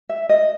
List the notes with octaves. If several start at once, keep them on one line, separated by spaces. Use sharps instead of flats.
E5
D#5